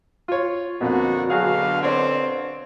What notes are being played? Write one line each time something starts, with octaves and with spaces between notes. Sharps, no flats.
F4 C#5
F2 B2 D3 A#3 F#4
B2 D3 F#3 F#4 G#4 F5
C4 D4 C#5